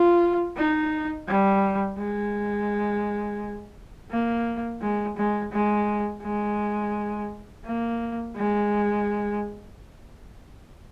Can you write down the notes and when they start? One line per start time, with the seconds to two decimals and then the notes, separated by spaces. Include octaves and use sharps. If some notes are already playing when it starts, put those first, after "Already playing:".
Already playing: F4
0.57 D#4
1.28 G3
1.98 G#3
4.10 A#3
4.81 G#3
5.17 G#3
5.52 G#3
6.23 G#3
7.65 A#3
8.36 G#3